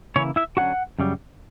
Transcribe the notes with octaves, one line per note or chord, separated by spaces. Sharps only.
C#3 E3 A#3 C#4 E4 C#5
E4 E5
D3 F#3 C#4 F#4 F#5
F#2 C#3 G3